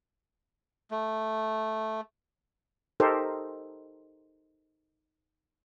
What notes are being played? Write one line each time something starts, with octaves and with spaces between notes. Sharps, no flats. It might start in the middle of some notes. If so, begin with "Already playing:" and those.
A3
D#4 G4 A4 A#4 C5